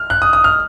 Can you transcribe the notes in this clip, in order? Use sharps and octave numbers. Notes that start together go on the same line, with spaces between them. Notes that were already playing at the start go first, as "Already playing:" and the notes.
Already playing: F6
F#6
D#6
D#6
F6